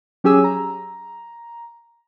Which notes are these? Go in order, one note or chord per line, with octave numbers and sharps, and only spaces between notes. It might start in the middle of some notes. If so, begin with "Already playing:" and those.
F#3 C#4 G4 G#4 G#5 E6
A#5